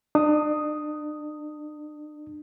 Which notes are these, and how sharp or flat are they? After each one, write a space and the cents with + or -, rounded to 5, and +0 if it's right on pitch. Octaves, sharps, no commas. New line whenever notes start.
D4 +40 D#6 +0